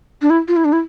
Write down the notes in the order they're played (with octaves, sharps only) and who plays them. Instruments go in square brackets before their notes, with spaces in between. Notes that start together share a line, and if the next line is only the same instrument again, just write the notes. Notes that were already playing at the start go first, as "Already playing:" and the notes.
[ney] D4
E4
F4
E4
D4
E4